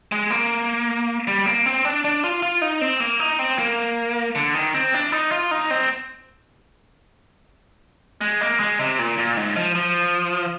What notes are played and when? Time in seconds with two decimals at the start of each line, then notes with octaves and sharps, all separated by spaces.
0.12 G#3
0.30 A#3
1.27 G3
1.46 A#3
1.66 C4
1.85 D4
2.04 D4
2.24 F4
2.43 F4
2.62 D#4
2.81 C4
3.00 A#3
3.19 D#4
3.39 C4
3.59 A#3
4.35 D3
4.55 D#3
4.74 C4
4.94 D4
5.12 D#4
5.31 F4
5.51 D#4
5.71 C4
8.21 G#3
8.41 A#3
8.60 G#3
8.80 C3
8.99 A#2
9.18 A#2
9.37 G#2
9.56 F3
9.75 F3